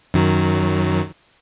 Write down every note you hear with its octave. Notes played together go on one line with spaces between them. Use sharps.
F#2 D#3 F#3